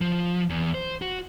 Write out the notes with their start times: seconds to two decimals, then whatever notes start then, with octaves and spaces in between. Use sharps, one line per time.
0.01 F3
0.50 E2
0.74 C5
1.02 F#4